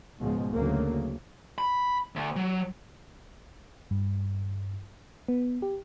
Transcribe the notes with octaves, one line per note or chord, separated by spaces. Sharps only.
C#2 G#2 B2 F3 G#3
D2 C#3 F#3 A3 A#3
B5
D2
F#3
G2
B3
G4